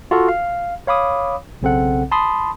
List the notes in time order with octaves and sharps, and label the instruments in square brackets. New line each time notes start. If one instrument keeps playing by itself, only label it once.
[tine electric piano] F4 F#4 A4 F5
F5
C#5 F5 B5 D6 D#6
B1 C#3 C4 A4 F#5
A5 B5 C6 D#6